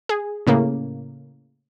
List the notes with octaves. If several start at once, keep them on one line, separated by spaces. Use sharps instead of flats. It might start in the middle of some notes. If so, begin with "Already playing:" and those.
G#4
A2 C#3 A#3